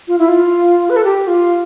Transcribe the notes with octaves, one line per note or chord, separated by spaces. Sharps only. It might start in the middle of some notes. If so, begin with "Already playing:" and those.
F4
E4
F4
B4
A4
G4
F4